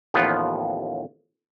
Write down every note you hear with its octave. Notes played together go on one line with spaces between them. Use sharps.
A1 D#2 F3 B3 F4